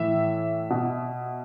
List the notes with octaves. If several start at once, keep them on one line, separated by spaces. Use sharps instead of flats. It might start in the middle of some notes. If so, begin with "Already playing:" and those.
Already playing: A2 E3 E5
B2